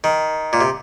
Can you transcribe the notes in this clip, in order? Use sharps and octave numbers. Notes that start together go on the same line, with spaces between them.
D#3
A#2
C3